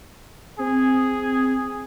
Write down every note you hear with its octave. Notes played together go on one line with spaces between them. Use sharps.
C4 G#4